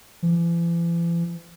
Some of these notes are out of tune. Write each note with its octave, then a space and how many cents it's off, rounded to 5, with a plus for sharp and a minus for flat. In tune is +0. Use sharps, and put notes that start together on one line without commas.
E3 +45